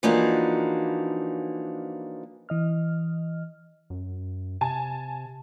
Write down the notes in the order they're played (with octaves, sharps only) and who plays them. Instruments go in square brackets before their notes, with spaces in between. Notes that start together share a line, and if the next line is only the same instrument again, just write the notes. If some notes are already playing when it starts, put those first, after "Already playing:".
[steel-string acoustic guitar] E3 F3 A#3 D4 D#4 F#4
[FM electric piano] E3 D#5 F6
[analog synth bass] F#2
[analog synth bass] C3 [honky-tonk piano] G#5 A5